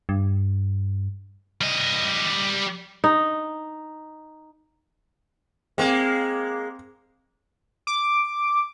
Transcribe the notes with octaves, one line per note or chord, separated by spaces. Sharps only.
G2
G3 D#5
D#4
G#3 A#3 C4
D6